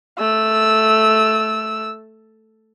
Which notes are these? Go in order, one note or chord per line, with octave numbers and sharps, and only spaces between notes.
A3 E6